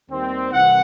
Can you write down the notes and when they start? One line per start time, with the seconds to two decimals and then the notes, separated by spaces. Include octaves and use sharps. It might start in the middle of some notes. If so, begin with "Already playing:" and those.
0.09 D#2 D#3 G3 C4
0.51 C2 C3 E3 F#5